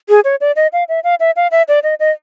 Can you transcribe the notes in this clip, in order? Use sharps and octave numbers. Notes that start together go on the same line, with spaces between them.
G#4
C#5
D5
D#5
F5
E5
F5
E5
F5
E5
D5
D#5
D#5